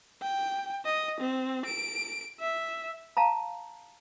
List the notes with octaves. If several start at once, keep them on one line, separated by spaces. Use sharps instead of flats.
G5
D#5
C4
D7
E5
F5 A5 A#5